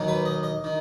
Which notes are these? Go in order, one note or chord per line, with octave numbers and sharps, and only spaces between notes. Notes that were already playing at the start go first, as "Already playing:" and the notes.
Already playing: D#2 D#3 F#3
B4
D#5
D#5
D#3